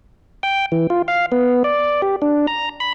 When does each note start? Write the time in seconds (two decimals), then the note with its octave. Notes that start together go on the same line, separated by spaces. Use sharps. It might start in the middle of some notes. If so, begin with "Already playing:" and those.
0.43 G5
0.72 E3
0.90 F4
1.08 F5
1.32 B3
1.64 D5
2.02 G4
2.22 D4
2.47 A#5
2.80 B5